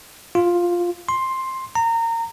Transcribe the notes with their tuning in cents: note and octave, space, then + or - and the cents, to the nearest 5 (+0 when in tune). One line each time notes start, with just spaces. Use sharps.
F4 +5
C6 +10
A#5 -25